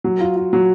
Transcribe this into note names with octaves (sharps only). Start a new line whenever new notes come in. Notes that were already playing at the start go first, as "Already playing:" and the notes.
F#3
F4
F4
F#3